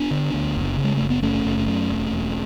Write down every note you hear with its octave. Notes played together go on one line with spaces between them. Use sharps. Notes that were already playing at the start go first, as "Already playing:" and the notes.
Already playing: B3 D4
D3
D2
F#1
C#3
G#3
F#1 A3
B3
F#1 A3 C#4
F#1
F#2
E1
E1